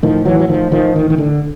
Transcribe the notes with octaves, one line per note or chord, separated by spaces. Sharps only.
A2 D#3 F3
E3 F#3
F#3
D#3 F3
D#3 F3
D#3
D#3
D3